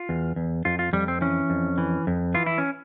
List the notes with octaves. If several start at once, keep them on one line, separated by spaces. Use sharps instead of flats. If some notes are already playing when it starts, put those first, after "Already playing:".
Already playing: F4
E2
E2
F2 F4
F4
F2 G3
C4
E3 C#4
F2
E3
F2
E3 F4
E4
C#4